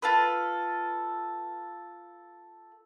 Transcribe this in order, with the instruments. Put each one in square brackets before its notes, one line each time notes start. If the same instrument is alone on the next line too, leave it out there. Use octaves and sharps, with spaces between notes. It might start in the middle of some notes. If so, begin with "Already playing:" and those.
[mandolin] F4 A4 B4